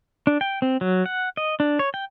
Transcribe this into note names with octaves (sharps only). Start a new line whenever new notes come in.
D4
G5
C4
F#3
F#5
D#5
D4
C#5
G5